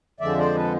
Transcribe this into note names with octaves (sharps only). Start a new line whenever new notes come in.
F2 D3 F3 G#3 D5 E5
C5 D5
A4 B4